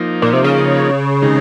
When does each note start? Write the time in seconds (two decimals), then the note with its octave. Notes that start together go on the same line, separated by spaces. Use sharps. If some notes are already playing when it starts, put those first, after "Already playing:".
Already playing: F3 A#3 D#4
0.22 A#2
0.33 C3
0.44 C#3
1.22 C3 D#3 G#3 D#4